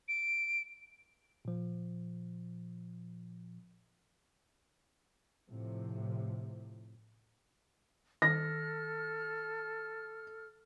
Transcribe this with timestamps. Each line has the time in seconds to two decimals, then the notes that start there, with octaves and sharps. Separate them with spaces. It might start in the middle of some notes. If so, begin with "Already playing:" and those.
0.08 D7
1.45 A#2 F3
5.49 A2 C3 F3
8.22 D#3 A4 F6 A#6